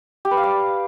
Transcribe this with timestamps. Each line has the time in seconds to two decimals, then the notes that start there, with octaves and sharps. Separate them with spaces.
0.25 G4
0.31 B4
0.37 F5
0.43 D5